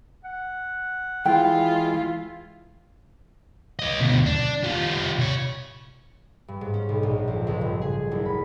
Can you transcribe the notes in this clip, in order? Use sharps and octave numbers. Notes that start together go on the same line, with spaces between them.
F#5
E3 G#3 E4 F4 G5
C#5 D#5
D2 B2
D4
G3 F4
C3 C#5
G2
G#2
C#4
B1
A#1
F2
C#2
G2
G#4
F#1
B5